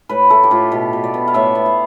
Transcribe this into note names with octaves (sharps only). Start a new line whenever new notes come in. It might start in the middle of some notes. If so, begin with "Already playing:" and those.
A2 B4
A3 A4
G4
A2 F4
B2 G4
B2
D5
B3
F5
A2 E5
B3
F5